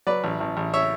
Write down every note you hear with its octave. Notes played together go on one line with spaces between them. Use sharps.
F#3 B4 D5
A1
A1
A1
C#5 E5